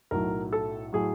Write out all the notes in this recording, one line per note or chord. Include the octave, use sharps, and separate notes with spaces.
B1 A2 F#3 A#4
A4
A2 F#3 G#4